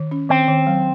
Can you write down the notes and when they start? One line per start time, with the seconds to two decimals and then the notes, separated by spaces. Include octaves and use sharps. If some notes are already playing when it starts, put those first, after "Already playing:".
Already playing: D#3
0.11 C#4
0.30 D#3 C4
0.48 D#3
0.67 F#3